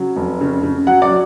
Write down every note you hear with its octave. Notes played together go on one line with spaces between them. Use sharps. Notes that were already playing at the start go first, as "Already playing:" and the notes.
Already playing: C#3 F#3
F1
C#3
C#3
F#3 F#5
D5
F#3